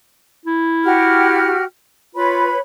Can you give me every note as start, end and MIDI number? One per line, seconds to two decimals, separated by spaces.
0.46 1.53 64
0.83 1.64 66
0.83 1.64 67
0.83 1.64 89
2.15 2.53 65
2.15 2.59 71
2.15 2.59 73
2.15 2.59 83